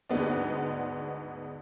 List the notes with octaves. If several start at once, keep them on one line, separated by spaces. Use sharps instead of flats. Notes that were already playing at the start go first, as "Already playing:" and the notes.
D2 G#2 G#3 B3 D4